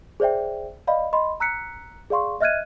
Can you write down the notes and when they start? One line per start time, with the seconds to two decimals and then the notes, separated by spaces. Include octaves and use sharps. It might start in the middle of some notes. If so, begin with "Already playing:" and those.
0.20 G#4 C5 D5 E5 G5
0.87 D5 D#5 F5 B5
1.13 D#5 B5 C6
1.40 A#5 E6 F#6 B6 C#7
2.10 G#4 D5 F5 C6 C#6
2.40 D#5 E5 F6 F#6 G#6 D#7